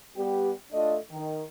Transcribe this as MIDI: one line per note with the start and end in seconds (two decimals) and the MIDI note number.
0.16 0.51 55
0.16 0.51 59
0.16 0.51 67
0.73 0.97 57
0.73 0.97 62
0.73 0.97 65
0.73 0.97 75
1.11 1.44 51